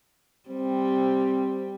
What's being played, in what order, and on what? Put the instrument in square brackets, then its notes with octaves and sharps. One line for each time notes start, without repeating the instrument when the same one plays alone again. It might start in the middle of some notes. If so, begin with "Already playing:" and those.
[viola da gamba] G3 [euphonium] C4